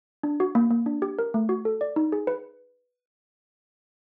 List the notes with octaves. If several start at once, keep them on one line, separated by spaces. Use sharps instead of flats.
D4
F#4
A#3
A#3
D4
G4
A#4
A3
F#4
A4
D5
D#4
G#4
B4